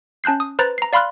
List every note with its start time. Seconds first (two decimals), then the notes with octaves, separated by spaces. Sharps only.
0.24 C#4 A5 F#6 G6 C7
0.40 D#6
0.59 B4 C5 A#5 F#6 A6
0.78 A#5 C7
0.93 D5 F5 B5 C6 F6 F#6